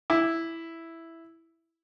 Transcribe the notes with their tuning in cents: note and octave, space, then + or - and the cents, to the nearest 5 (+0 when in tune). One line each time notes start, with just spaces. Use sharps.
E4 +0 D6 +15